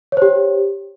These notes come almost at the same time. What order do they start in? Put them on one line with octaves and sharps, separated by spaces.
C#5 C5 G4